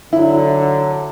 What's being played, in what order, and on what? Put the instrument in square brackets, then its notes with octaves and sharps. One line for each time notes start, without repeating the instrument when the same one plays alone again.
[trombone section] D3 [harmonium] F#3 [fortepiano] E4